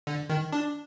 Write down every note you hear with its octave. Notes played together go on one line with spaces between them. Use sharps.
D3
D#3
D4